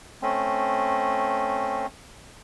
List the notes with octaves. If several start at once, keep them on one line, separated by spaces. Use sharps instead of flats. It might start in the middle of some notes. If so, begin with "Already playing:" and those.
A3 C4 C#4